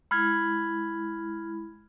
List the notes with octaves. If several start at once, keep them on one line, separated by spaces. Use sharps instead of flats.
G#3 E4 B5 F6 G#6